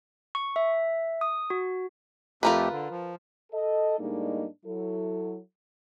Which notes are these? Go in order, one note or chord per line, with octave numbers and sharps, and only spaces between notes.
C#6
E5
D#6
F#4
F2 A3 F4 G4 A#4 B4
D3
F3
A4 D#5
A2 G3 G#3 A#3 D4 D#4
F#3 E4 A4